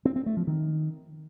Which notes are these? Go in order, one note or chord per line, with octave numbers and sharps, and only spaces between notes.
C4
C4
A3
F3
D#3